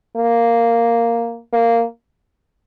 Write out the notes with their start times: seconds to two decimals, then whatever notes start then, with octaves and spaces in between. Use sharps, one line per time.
0.17 A#3
1.53 A#3